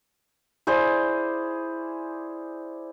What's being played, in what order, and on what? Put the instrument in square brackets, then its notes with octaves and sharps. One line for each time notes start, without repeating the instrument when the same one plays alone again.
[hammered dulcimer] E4 G#4 C5 D5